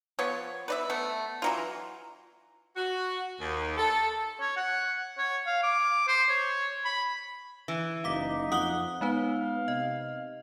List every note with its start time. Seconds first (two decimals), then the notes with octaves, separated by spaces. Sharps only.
0.19 F3 B3 C#5
0.68 B4 D5 E5
0.90 A3 B3
1.42 E3 F#3 F4
2.76 F#4
3.40 D#2
3.77 A4
4.40 C#5
4.57 F#5
5.18 C#5
5.47 F5
5.63 D6
6.08 C5
6.29 C#5
6.85 B5
7.68 E3
8.04 F#1 D#4 F5 D6 B6
8.52 F2 F#5 D#6 G7
9.01 G#3 B3 D#4 B4 F5
9.68 C3 D#5